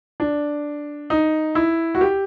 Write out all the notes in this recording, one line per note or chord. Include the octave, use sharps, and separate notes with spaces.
D4
D#4
E4
F#4
G4